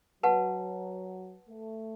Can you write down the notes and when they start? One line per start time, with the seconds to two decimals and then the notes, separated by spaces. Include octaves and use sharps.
0.23 F#3 B4 F#5 A5
1.49 A3